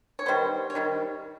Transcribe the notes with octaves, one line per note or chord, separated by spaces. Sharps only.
C#5
D#3 G3 B3 C5
C#5
D#3 G3